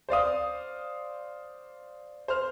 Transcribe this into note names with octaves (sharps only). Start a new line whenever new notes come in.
C5 D5 F5 D#6
C5 F6